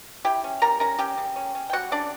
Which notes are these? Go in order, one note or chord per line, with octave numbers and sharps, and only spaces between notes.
E4 G4 G5
C#4
G3 A#4 A#5
C#4 A#4 A#5
C#4 G4 G5
C#3
C#4
C#4
G5
G3 F#4 F#5
C#3 D4 D5